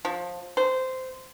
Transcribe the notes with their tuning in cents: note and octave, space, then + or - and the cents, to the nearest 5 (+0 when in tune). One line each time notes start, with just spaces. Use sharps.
F3 +20
C5 -15